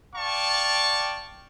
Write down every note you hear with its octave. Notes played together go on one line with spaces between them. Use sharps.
D5 F5 G5 A5 C#6